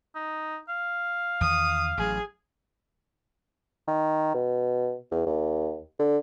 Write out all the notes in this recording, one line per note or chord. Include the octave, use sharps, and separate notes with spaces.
D#4
F5
E2 D#3 D#6
A1 F#3 G#4
D#3
B2
E2
D#2
D3